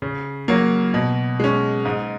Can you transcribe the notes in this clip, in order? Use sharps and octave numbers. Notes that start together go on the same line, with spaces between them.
C#3
F#3 A#3
B2
G#3 C#4
G#2